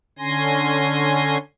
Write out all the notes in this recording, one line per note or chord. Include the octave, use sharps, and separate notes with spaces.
D3 C#4 G#5 C6 A#6